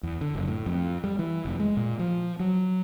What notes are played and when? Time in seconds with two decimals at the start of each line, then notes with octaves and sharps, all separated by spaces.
0.03 E2
0.21 D3
0.35 F#1
0.48 A2
0.66 F2
1.04 G3
1.19 E3
1.45 F1
1.60 G#3
1.77 A#2
1.99 F3
2.40 F#3